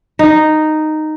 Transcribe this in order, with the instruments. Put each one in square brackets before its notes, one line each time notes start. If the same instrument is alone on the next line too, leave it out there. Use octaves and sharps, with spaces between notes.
[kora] D#4